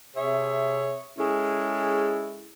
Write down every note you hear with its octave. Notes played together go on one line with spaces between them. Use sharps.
C3 G#4 C#5 E5
G#3 C#4 E4 G#4 A4